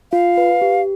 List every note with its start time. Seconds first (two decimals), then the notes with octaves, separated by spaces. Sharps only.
0.12 F4 F5
0.37 B4
0.62 G4